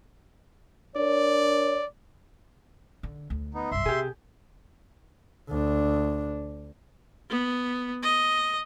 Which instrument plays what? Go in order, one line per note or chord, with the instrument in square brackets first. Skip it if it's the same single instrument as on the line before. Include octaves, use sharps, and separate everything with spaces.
[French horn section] D4 A#4 C#5 [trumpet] D5
[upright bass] D3
D2
[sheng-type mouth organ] B3 D#4
[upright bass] C2 G2 [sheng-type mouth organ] E5 C6
[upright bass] C3 [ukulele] G4 G#4
[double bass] D2 D4
[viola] B3
D#5